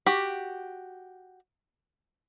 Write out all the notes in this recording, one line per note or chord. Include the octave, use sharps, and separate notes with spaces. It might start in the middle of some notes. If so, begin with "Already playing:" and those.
F#4 G4